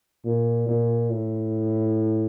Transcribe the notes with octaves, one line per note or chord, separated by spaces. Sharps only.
A#2
A#2
A2